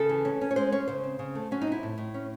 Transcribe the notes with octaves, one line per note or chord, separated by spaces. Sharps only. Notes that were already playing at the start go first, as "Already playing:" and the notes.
Already playing: C#3 A4
E3
C#4
C#4
C#5
G#3 C5
C#4 C#5
C#3 C5
C4
C#3
A3
F#3 C#4
D#4
C3 E4
A2
A2
C#4